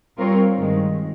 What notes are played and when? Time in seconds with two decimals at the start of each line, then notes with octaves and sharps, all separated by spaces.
0.17 G3 C4 F4 A#4 C#5
0.57 G2 D#3 G#3